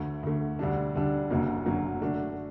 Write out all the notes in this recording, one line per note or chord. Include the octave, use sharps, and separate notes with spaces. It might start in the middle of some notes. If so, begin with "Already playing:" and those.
Already playing: D2 D3 A3
D2 D3 A3
D2 D3 G3 D4
D2 D3 G3 D4
F#1 F#2 D3 F#3 A#3
F#1 F#2 D3 F#3 A#3
D3 A3 D4 F#4